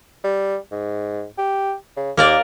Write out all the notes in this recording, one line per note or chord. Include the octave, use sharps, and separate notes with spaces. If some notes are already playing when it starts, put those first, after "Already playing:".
G3
G#2
G4
C#3
D#2 A#3 A#4 D5